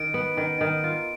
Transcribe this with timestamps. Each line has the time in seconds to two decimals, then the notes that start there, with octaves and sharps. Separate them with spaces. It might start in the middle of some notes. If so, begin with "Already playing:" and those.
Already playing: D#3 D7
0.14 B3
0.37 D#3
0.61 D#3
0.84 F4